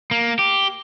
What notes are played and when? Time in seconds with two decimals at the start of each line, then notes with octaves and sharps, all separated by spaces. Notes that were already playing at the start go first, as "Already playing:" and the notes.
0.11 A#3
0.39 G4